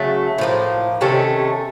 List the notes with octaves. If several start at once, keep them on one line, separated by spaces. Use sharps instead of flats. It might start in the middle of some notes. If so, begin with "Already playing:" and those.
Already playing: C#3 F#3 A3
A2 F3 A#3
C3 D#3 A3 C#4